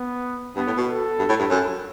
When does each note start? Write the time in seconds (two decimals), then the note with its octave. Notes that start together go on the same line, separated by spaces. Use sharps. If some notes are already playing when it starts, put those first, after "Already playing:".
Already playing: B3
0.56 G2 B3
0.67 A2
0.77 B2
0.88 A4
1.19 G2
1.29 A2
1.39 G2
1.50 F#2